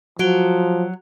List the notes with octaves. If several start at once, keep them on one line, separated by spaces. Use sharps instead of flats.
F3 F#3 F#4 D7 G7